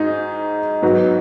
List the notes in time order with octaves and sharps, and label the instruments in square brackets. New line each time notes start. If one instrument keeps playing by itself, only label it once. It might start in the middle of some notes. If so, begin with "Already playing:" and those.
Already playing: [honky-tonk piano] G#2 G#3 F#4 [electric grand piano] D#4
[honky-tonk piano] G#2 F#3 B3 F#4